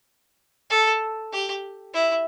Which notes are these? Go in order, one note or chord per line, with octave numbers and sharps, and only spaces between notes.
A4
G4
E4